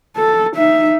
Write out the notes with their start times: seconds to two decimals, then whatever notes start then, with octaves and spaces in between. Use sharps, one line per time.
0.17 A4
0.56 D#4 E5